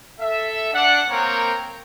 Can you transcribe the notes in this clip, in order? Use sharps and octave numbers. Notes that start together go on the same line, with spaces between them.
A4 E5
D4 F#5
A#3 C4 A#4 C#5 G5 A#5